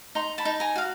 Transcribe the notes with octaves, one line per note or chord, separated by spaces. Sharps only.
D#4 A#5 C6
A5 B5
D#4
G#5 A#5
F#4 F5